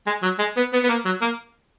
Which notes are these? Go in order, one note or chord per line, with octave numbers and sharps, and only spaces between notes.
G#3
F#3
G#3
B3
B3
B3
A#3
F#3
A#3